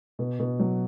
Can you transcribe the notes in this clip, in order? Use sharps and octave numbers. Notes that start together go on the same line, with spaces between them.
B2
B2
F#3